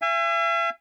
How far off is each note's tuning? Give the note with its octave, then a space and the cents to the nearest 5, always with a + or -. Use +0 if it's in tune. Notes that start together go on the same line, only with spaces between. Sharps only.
E5 +40 G#5 -25